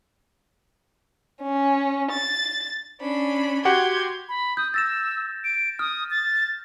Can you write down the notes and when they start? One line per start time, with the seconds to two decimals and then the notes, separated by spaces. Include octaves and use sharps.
1.42 C#4
2.11 A6
3.00 C#4 D4 B5
3.65 F#4 G4 F#5 C6 G6 G#6
4.29 B5
4.57 D#6 G6
4.74 E6 A6 A#6 E7
5.44 D7
5.79 D#6 F6
6.11 A6